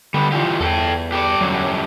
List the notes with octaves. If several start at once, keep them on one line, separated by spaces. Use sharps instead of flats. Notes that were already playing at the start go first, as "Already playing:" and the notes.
D3 G3 B3
E3 F4 G4
E2 A4 F#5 G5
G4 A4 D5
F#2 D3 F#3 G3